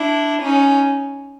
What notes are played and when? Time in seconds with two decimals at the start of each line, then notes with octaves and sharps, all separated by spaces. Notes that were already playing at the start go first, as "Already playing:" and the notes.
Already playing: D4 E4
0.41 C#4 D#4